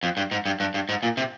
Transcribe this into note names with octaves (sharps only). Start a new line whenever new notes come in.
F2
G2
G#2
G2
G2
G2
G#2
A#2
C3